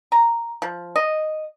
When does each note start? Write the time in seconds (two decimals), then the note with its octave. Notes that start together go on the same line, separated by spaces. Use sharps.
0.12 A#5
0.62 F3
0.96 D#5